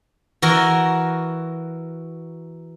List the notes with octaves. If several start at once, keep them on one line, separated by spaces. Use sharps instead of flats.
E3 F#4 A#4